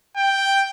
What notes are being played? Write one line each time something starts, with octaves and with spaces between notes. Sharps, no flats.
G5